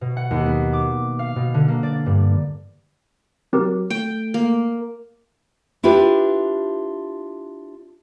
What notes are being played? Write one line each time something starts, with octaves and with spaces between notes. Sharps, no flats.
B2
F#5
D#2
B3
D6
F5
B2
D3
A#3
D5
G2
F#3 C4 G4 A#4
A3 G5
A#3
D4 E4 F4 G4 B4